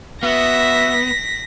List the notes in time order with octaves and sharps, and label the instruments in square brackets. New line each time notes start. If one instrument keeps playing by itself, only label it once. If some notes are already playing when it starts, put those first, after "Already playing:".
[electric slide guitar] B3 [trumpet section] F#4 E5 [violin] A#6 B6